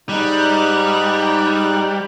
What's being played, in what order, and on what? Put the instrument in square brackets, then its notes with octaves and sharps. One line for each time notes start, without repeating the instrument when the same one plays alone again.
[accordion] G#2 D#4 F#6 [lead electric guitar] G3